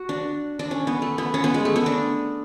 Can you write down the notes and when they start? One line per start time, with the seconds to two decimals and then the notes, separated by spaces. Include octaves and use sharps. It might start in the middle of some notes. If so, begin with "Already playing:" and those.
Already playing: F#4
0.09 D4
0.59 D4
0.71 C#4
0.87 B3
1.02 A3
1.18 B3
1.34 C#4
1.44 B3
1.54 G#3
1.65 A3
1.76 B3
1.86 D4